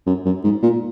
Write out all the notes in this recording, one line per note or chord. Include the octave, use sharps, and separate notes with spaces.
F#2
F#2
G#2
A#2